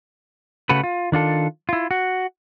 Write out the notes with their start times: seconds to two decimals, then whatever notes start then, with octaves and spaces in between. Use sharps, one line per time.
0.69 C#3 A3 F#4 B4
0.83 F4
1.12 D#3 D4 F4 A4
1.69 E4 F4
1.91 F#4